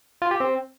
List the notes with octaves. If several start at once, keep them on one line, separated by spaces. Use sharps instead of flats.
F4
G4
C4